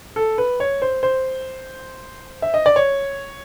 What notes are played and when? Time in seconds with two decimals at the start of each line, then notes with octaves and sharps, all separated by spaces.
0.16 A4
0.38 B4
0.60 C#5
0.82 C5
1.03 C5
2.42 E5
2.54 D#5
2.66 D5
2.76 C#5